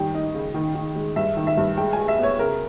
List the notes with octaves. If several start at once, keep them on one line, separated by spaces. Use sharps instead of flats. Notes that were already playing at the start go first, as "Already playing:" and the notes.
Already playing: D#3 G3 G5
D#4
C#3
D#3
D#3
G#3
G2 E5
D#3
E5
G2
G#3 G5
G#5
G#3
E5
B3 C#5
C#3 A#4